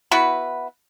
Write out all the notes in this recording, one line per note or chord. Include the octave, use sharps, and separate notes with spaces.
B3 E4 F#4 B4